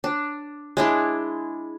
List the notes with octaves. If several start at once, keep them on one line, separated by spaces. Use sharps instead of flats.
D4
G#3 D4 E4